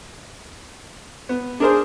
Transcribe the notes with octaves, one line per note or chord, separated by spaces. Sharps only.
B3
D4 G#4 A#4 C5